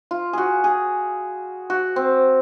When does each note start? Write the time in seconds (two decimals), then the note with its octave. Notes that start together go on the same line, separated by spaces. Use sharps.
0.11 F4
0.33 F#4 G#4
0.64 G#4
1.70 F#4
1.96 C4